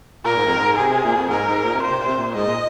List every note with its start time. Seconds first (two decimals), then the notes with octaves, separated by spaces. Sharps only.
0.25 A#2 A#4
0.36 G#2
0.46 F2
0.56 G#2
0.77 C3 G#4
0.91 C3
1.04 A#2
1.16 F2
1.30 G#2 A#4
1.48 G#2
1.65 A#2
1.74 C3
1.82 A#2 C5
1.90 C3
1.99 A#2
2.07 C3
2.16 A#2
2.35 G#2 D#5
2.47 A#2